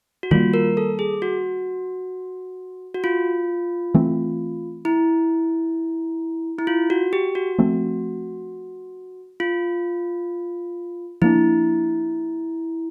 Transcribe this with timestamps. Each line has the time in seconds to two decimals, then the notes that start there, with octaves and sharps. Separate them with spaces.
0.23 F#4
0.31 D#3 G3 A#3 F4
0.54 A#4
0.77 A4
0.99 G#4
1.22 F#4
2.94 F#4
3.04 F4
3.94 E3 A3 C4
4.85 E4
6.59 E4
6.67 F4
6.90 F#4
7.13 G4
7.35 F#4
7.58 F3 A3 C4
9.40 F4
11.22 F3 A#3 D4 E4